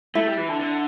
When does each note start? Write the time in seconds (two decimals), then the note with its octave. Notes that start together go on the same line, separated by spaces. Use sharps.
0.15 A3 E4
0.27 G3
0.37 E3
0.49 D3
0.60 D3